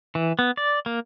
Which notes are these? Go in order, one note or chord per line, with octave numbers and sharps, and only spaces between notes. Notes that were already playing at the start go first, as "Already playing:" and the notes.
E3
B3
D5
A#3